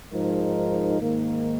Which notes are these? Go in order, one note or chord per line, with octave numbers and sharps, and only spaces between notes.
G#2 F3 G#3 D#4 A#4
G#2 D#3 A#3